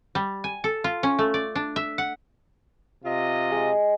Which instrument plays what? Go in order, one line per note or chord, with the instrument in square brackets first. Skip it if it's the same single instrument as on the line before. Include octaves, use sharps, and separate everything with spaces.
[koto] G3
G#5
A4
F4
C#4
A3
D5
D4
E5
F#5
[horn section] C3 F4 D#5
[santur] G#3